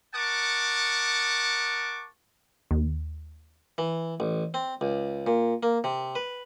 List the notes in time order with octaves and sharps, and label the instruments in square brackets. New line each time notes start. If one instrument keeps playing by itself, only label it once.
[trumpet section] A#4 F#5 A5 C#6 D6
[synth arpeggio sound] D#2
[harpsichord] E3
A1
C4
C#2
A#2
A#3
C3
B4